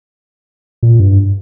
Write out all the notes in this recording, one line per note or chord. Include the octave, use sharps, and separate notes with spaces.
A#2
G2